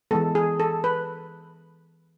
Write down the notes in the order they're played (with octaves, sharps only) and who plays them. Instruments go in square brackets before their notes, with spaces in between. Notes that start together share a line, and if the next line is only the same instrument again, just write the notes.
[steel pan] E3 G#3 B3 A4
G#4
A4
B4